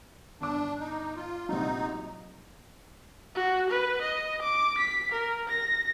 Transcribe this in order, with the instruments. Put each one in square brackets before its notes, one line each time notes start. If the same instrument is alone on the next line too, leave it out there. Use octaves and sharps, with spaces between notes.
[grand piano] G1 D6 [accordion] D4
[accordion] D#4
F4
[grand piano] A#1 C3 F#3 [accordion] D#4
[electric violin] F#4
B4
D#5
D6
B6
A#4
A#6